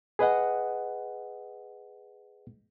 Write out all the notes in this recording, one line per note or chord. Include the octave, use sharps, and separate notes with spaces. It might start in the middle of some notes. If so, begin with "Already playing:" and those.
G#4 B4 D#5 F#5